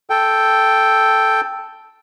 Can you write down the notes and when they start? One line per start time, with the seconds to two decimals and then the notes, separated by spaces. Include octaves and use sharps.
0.10 A4 G5